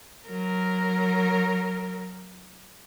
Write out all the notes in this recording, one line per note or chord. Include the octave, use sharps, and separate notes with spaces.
F#3 A#4